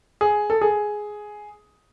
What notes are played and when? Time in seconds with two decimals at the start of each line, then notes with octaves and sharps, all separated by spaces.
0.21 G#4
0.50 A4
0.61 G#4